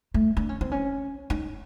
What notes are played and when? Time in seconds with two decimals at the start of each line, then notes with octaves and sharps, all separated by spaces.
0.14 A3
0.37 D4
0.49 C#4
0.61 C4
0.72 C#4
1.30 D#4